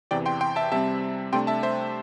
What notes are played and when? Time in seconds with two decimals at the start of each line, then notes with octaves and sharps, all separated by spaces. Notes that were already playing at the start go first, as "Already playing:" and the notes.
0.11 E2 C3 E3 D5 G5
0.26 G5 C6
0.41 G5 C6
0.56 E5 A5
0.72 C3 G3 C4 E5 A5
1.33 C3 A3 D4 G5 C6
1.47 E5 A5
1.63 C5 E5